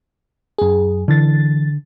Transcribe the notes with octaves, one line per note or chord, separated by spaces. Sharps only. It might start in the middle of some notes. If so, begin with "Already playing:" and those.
F#2 G#4
D3 E3 A6